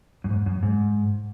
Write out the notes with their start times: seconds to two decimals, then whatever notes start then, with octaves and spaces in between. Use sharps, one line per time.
0.24 F#2
0.30 G#2
0.46 F#2
0.63 G#2